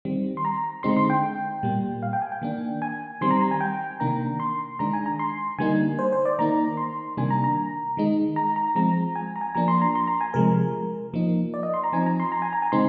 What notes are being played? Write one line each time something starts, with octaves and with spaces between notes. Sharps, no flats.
D#3 G3 C4
C6
A#5
D3 G#3 C4 D#4 C6
C6
G5
A#2 G3 A#3
F5
G5
G#5
G5
D#3 A#3 D4
G#5
D#3 G3 C4 C6
A#5
A#5
G#5
G5
C3 D#3 A#3 D4 A#5
C6
D#3 G#3 D4 A#5
G#5
A#5
C6
D3 G3 A#3 D#4 G#5
C5
C5
D5
D#3 A#3 D#4 A#5
C6
C3 D#3 G3 A#3 D4 G#5
A#5
A#5
D#3 G#3 D#4
A#5
A#5
F3 G#3 C4 A#5
G#5
A#5
G#5
F3 A#3 D4 A#5
C6
A#5
C6
A#5
G#5
C3 F3 G#3 A#4
F3 A#3 D#4
D5
D#5
C6
A#5
F3 C4 D#4 G#5
A#5
C6
A#5
G#5
A#5
G#5
D3 G#3 C4 D#4 C6